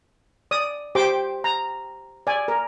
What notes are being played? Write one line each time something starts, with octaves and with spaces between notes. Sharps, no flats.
D5 D#6
G4 C5 G5 D6
A#5
D5 G#5
A#4